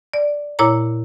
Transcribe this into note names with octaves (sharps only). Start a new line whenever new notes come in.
D5
A#2 E4 C#5 A#5